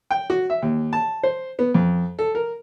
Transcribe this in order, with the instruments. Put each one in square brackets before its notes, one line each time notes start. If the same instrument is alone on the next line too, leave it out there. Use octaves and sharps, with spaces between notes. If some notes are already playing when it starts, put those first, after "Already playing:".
[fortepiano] G5
F#4
E5
D#2
A5
C5
B3
F2
A4
A#4